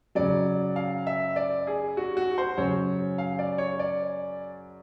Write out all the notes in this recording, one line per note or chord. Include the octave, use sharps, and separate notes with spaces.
F#2 C#3 F#3 D5
F5
E5
D5
G#4
F#4
F#4
C5
F#2 C#3 F#3 C#5
F5
D5
C#5
D5